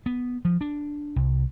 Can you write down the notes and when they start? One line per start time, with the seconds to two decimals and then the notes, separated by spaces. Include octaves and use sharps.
0.06 B3
0.45 F3
0.61 D4
1.16 C2